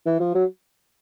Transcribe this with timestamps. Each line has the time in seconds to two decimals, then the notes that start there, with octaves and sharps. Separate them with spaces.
0.06 E3
0.20 F3
0.35 F#3